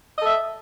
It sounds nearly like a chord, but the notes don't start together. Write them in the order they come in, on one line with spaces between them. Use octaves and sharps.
D#5 A4 E5